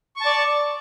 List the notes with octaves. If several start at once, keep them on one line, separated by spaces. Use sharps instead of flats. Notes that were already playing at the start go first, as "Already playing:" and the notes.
D5 A5 C#6